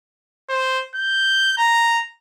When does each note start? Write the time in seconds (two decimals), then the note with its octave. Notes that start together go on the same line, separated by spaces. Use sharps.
0.49 C5
0.95 G6
1.58 A#5